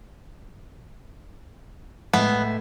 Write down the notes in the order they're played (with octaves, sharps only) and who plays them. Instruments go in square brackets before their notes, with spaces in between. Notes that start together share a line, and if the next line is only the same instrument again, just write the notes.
[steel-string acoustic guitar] A2 G#3 E5 [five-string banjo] B3